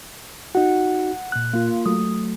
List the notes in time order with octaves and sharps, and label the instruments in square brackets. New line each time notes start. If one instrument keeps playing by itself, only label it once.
[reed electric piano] D#4 F#4 [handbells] F#5
[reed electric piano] A#2 F#6
[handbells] A#3 F4
[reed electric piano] F#3 A3 [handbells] D#6